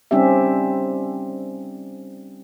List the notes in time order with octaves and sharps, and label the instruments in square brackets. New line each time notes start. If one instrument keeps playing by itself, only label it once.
[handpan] G3 C4 C#4 D#4 G4 E5